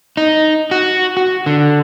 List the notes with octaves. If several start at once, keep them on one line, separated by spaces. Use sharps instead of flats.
D#4
F#4
F#4
D3